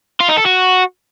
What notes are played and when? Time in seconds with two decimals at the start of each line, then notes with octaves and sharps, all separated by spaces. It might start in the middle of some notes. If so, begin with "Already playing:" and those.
0.20 F4
0.29 D#4
0.37 A4
0.45 F#4